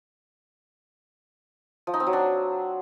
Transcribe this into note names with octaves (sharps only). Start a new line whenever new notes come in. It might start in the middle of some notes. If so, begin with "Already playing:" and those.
F3
D#4
C4
F#3
D4